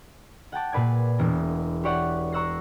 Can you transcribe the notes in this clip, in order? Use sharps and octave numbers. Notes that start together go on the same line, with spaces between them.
F#5 G5 A5 D6
A#2 G#4 B4 D5 G#6
E1 B3 E4 A#4
G4 B4 C#5 D5 F#5
A#5 C#6 E6 F#6 A#6 C7